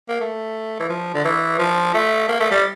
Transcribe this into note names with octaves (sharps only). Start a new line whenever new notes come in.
A#3
A3
E3
F3
D3
E3
F3
A3
A#3
A3
G3